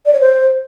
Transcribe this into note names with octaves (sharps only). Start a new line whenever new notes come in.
D5
C#5
C5